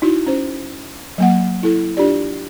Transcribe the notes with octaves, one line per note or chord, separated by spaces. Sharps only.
D#4 E4 F#4
C#4 C5
F#3 A#3 F#5
E4 A4
D4 F4 G4 D5